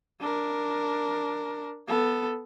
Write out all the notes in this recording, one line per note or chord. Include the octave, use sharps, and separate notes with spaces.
D4 A#4
B3 A4